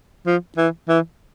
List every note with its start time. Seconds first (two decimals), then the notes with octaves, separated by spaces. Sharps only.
0.27 F3
0.58 E3
0.89 E3